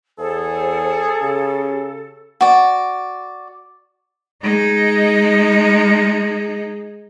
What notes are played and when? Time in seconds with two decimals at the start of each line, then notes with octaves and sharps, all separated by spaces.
0.19 E2 G#4 A4 C5
1.21 C#3 G4
2.41 F#4 D5
4.43 G#3 D#4